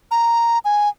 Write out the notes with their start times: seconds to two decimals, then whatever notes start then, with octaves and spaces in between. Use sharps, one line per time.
0.11 A#5
0.65 G#5